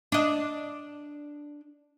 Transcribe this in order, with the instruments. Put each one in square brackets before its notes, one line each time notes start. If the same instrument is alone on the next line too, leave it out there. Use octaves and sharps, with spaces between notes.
[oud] D4 D#5